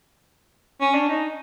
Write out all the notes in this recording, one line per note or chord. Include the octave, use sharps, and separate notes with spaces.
C#4
D4
D#4